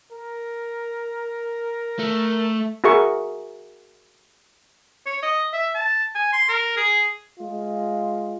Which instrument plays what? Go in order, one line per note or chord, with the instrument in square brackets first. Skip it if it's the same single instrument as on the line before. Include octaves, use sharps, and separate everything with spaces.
[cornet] A#4
[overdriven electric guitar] A3
[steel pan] F#4 G#4 A#4 E5 C#6
[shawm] C#5
D#5
E5
A5
G#5
C6
A#4
G#4
[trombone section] G#3 F4